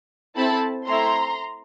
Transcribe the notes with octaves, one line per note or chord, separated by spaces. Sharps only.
C4 E4 A4 A5 B5
A3 C4 E4 A#5 C6